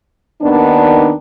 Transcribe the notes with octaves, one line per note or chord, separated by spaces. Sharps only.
D#2 D#3 B3 D4